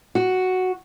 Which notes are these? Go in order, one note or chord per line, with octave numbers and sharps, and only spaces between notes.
F#4